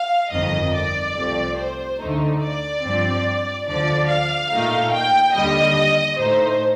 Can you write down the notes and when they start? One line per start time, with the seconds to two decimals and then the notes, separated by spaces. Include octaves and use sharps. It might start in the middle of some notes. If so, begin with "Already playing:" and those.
Already playing: F5
0.31 G1 F2 D#3 D#5
0.74 D5
1.16 C2 C3 F3 A3 C4
1.58 C5
2.00 D2 D3 A3 D#4
2.42 D5
2.83 G2 F3 C4
3.68 D2 D3 F3 D5
4.10 F5
4.52 A#2 A3 D#4
4.94 G5
5.36 D#2 D3 G3 D#5
6.20 A2 A3 D#4 C5